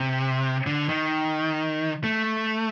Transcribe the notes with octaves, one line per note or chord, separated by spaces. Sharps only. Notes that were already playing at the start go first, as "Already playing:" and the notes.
Already playing: C3
D3
D#3
A3